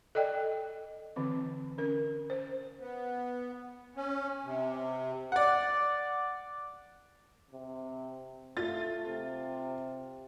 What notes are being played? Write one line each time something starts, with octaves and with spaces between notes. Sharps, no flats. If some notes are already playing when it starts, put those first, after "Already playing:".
A4 D5 D#5 G5
D3 E3 C4
C#4 A#4
C5
B3
C#4
C3
D5 F#5
C3
A3 F4 A6
C3